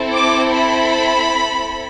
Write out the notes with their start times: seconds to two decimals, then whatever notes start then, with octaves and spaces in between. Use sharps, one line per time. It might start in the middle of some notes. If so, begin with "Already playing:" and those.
Already playing: C4 E4 A4
0.14 D6
0.52 B5